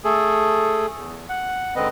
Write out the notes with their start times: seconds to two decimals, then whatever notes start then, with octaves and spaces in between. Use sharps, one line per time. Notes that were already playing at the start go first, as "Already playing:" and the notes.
0.04 A3 G#4 A4
0.96 E2
1.29 F#5
1.76 G#2 D3 C4 B4 D#5